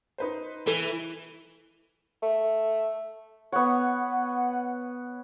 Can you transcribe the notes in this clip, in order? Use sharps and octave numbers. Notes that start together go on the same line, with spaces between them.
D#4 B4 C5
E3 A4
A3
B3 C#5 F#5